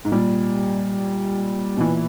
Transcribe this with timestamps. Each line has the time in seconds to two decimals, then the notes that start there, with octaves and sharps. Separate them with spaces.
0.05 G#2
0.12 A#2 G3
1.77 B2
1.81 A#2 E3